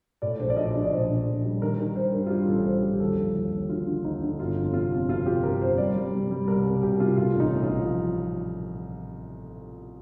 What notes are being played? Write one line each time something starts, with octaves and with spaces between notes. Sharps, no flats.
A2 D5
A#1 C5
D5
A#1 D#5
A#1 D5
D5
A#1 C5
A#1
A#1
G3
D#3 A#4
D#3 A#4
G3 C5
G2 A#4
F4
G3 G4
A1 A4
G3 C5
G3
G4
D#2 A4
F3
D#2
D#2
D3 F4
D3
D#2 D#4
D3
G1 F4
F2
C3 F4
F2
F2 F4
C3 G4
G1 A#4
F2 C5
G3 D5
G3
C3
G3
C2 A#4
C2 A#4
C2 G4
C3 F4
A2 F4
A1 D#4
A1
F4
A1
F3